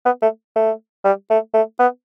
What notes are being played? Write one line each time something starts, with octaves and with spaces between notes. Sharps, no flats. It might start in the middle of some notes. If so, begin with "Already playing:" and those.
B3
A3
A3
G3
A3
A3
B3